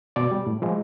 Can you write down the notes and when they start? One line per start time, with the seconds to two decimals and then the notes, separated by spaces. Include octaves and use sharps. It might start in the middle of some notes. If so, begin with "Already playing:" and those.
0.16 B2 D5
0.32 G3
0.47 A2
0.62 F3 G#3